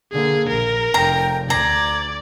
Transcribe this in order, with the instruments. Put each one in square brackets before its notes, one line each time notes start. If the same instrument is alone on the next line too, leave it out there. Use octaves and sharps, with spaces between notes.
[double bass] D3 A#3 [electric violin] G#4
[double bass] A#1 [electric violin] A#4
[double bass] F1 [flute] G5 [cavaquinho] A#5
[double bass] D2 [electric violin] D5 [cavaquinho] A#5 [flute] G#6